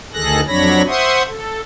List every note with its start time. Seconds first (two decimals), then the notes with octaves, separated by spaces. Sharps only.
0.13 D2 D#3 G#4 A4 F#6 A#6
0.47 F2 F#3 D4 C#5 B5 A#6
0.87 C5 E5 F#5 C6 C#6 D#6
1.28 A4